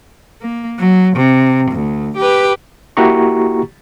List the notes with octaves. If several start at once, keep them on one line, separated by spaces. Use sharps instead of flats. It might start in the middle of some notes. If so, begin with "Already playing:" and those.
A#3
F#3
C3
D2
G4 B4
A#3 E4 F#4 G4 A#5 C#6